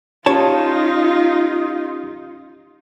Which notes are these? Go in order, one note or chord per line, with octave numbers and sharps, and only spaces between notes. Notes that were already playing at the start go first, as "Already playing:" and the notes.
C#4 D#4 F4 G4 C#5 A5